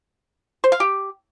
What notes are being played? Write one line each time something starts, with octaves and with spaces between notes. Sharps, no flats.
C5
F5
G4